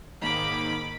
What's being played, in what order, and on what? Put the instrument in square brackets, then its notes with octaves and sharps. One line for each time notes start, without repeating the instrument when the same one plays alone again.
[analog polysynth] G#2 D#3 A#3 [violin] B5 D6